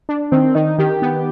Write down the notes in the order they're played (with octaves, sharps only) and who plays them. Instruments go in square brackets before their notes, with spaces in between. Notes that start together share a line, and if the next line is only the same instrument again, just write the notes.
[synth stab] D4
[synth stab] D#3 [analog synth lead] C4
[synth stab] D#3 [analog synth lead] D#4
[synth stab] D#3 [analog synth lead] G4
[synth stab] B3